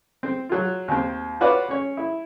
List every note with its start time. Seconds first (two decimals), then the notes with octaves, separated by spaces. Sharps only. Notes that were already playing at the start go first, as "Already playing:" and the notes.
0.23 C4
0.49 F#3 F4
0.88 D#2 C4
1.40 F4 F#4 B4 C#5 D5 F5
1.69 C#4 C#5
1.97 E4